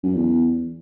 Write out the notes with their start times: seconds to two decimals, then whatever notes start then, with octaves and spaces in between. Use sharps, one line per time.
0.03 F#2
0.15 E2